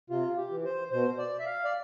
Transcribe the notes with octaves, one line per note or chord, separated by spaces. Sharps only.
C3 F4
G4
E3
C5
B2 C5
D5
E5
F5
D5